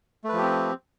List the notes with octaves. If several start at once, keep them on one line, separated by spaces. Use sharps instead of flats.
F3 A3 C4 G4 B4